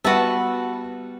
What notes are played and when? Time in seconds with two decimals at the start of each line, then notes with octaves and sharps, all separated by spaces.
0.04 G3 B3 F#4 B4 E5 A5